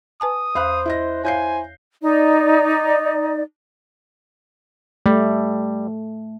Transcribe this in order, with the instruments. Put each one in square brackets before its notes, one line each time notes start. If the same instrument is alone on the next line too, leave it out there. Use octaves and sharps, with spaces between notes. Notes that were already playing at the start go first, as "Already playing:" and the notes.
[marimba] B4 G#5 A5 [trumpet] D#6
[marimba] E2 [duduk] C5 [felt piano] F5 B5 F#6
[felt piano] E4 D#5 A#6
[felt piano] E4 G6 C7 [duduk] C5 [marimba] C#5 F5 [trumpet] G#5
[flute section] D#4 D5
[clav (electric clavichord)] G3 [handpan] A3